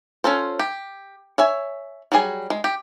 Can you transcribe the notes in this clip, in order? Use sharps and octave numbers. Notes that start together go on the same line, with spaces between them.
C#4 F4 A4 C5
G4
C#5 E5 G#5
F#3 G3 G#4 G#5
G#3
G4